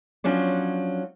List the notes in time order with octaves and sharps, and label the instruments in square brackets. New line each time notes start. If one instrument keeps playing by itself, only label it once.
[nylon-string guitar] F3 F#3 C#4 D4